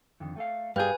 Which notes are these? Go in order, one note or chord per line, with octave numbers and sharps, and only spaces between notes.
F2 D3 D#3
A3 A4 F5
G2 F#3 G#4 A#4 B4 F5 G#5 G6